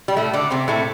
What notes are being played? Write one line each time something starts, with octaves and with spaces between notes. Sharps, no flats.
G3
A2 A3
D3 D4
C3 C4
A2 A3